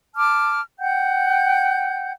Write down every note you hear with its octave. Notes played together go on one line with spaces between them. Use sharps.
A5 D6 F6
F#5 G5 G6